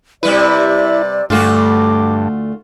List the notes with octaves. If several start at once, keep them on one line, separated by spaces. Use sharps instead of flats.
C3 G3 E4 B4 D5
D2 G2 A3 F4 F#4 D6